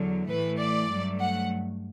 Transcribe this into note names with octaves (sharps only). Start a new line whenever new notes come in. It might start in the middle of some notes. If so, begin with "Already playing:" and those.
Already playing: E2 D3 F#3
A2 E3 A3 B4
D5
G2 F#3 A3
F#5